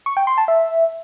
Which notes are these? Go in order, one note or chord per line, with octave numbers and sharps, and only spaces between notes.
C#6
G5
C6
A5
E5